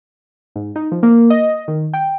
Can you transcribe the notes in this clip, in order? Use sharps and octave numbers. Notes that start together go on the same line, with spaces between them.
G#2
D#4
F3
A#3
D#5
D#3
G5